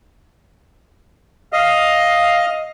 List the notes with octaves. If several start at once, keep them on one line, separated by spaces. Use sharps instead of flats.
D#5 F5